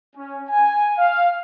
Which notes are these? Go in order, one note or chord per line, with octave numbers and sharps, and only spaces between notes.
C#4
G#5
F5